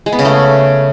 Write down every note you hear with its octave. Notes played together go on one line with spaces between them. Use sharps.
G#3
B3
C#3
A3